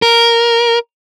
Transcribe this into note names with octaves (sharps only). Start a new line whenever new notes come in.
A#4